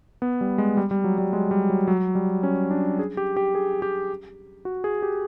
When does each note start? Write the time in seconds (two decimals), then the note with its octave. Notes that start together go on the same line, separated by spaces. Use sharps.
0.22 B3
0.41 G3
0.58 G#3
0.77 G3
0.91 G3
1.04 F#3
1.18 G3
1.33 G#3
1.51 G3
1.70 F#3
1.87 F#3
2.15 G3
2.43 C#4
2.71 D4
2.99 G#4
3.17 G4
3.37 G4
3.55 G#4
3.82 G4
4.65 F#4
4.84 G#4
5.02 G4